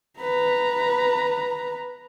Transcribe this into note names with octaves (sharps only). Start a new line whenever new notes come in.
B4 A#5